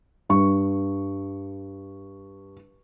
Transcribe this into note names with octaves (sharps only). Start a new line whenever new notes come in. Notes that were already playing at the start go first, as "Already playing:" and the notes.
G2 C#6